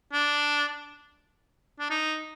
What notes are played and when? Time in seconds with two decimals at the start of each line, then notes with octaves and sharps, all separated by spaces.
0.13 D4
1.79 D4
1.90 D#4